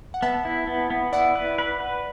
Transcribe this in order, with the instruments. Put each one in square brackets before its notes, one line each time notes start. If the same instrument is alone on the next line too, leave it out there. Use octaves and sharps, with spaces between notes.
[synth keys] F#5
[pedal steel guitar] B3 [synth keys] E5 A5
[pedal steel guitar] E4
B3
B3
[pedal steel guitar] E4 [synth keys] D5 F#5
[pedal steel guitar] B4
B4
B4